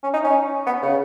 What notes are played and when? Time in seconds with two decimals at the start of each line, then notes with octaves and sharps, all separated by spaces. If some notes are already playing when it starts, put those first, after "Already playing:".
0.03 C#4
0.13 D#4
0.24 C#4
0.66 B3
0.82 C#3